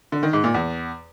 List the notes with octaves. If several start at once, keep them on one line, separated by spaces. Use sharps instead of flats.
D3
D#3
G#2
A#2
E2